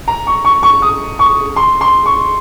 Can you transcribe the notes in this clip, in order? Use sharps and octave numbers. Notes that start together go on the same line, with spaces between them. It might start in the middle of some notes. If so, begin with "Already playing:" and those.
A#5
C#6
C#6
C#6
D#6
C#6
C6
C6
C#6